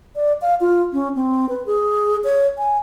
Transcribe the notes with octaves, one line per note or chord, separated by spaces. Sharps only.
D5
F5
F4
C#4
C4
B4
G#4
C#5
G#5